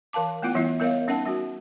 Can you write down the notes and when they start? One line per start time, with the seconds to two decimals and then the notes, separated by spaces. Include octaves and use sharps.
0.13 E3 A#4 F5 A5 D6
0.42 A3 B3 E4 F4 F#5 G5
0.55 E3 G3 B3 E4
0.79 G3 B3 A#4 C#5 D#5 F5
1.08 G3 C#4 D#4 A#4 F#5 A5
1.26 G3 C#4 F#4